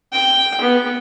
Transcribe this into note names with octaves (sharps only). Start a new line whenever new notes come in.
G5
B3